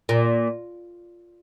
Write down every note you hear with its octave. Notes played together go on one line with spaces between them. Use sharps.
A#2